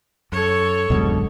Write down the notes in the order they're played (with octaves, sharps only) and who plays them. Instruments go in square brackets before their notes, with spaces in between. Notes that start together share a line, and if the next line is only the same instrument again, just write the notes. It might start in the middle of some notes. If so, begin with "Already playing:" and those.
[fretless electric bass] F#2 [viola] A4 C#5
[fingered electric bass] D1 F#2 G#3 [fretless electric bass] A#1 B2 D3